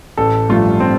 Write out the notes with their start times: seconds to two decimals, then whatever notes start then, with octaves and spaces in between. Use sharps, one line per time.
0.17 A1 A4
0.49 G2 F3 A3 F4
0.80 C4